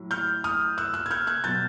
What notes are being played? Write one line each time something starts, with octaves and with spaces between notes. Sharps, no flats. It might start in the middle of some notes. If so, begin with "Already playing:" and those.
Already playing: A2 F#3
F6 G6
D#6 F6
E6 F#6
E6 F#6
G#6
F6 G6
F#6 G#6
B2 F#3 G6 A6